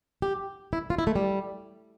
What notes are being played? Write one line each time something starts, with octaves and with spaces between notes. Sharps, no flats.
G4
E4
F4
E4
A3
G3